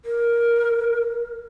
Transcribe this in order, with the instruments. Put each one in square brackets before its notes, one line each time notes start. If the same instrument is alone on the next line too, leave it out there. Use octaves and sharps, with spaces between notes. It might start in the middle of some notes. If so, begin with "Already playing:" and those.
[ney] A#4